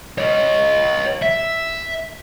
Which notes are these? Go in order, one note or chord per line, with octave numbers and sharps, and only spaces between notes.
C#5 D#5
E5